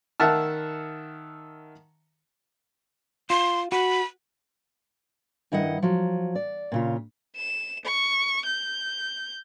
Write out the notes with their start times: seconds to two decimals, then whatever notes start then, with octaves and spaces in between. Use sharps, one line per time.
0.20 D#3 E5 F#5 A5 F6
3.30 F4 C6
3.72 F#4 B5
5.52 G2 D#3 E4 D#5 F#5
5.82 F3 F#3
6.35 D5
6.72 A#2 C#3 F4
7.36 E7
7.85 C#6
8.46 G6